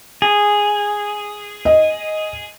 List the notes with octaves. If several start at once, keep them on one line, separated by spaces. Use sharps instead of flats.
G#4
D#5